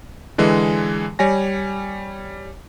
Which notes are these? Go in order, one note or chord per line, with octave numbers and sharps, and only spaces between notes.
D3 E3 G#3
G3 C#5 G#5 A#6